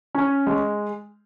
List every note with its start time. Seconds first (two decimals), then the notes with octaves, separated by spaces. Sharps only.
0.15 C#4
0.47 G#3